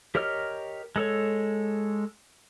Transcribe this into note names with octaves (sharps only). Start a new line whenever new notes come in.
G4 A#4 C#5 D#5 F6
G#3 A4 C#5